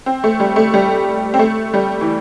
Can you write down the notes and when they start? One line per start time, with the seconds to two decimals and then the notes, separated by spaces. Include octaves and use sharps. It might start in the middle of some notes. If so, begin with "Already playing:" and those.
0.06 C4
0.24 A3
0.40 G3
0.56 A3
0.74 G3
1.34 C4
1.39 A3
1.74 G3
2.01 E3